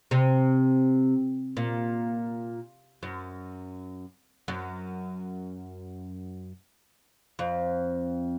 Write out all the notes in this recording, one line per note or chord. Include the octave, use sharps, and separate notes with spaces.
C3
A#2
F#2
F#2
F2